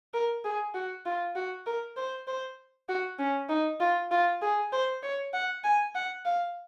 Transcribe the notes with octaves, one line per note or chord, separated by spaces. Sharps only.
A#4
G#4
F#4
F4
F#4
A#4
C5
C5
F#4
C#4
D#4
F4
F4
G#4
C5
C#5
F#5
G#5
F#5
F5